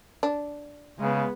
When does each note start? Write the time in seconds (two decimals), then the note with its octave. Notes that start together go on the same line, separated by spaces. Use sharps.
0.23 D4
0.99 C#3 G#3 B3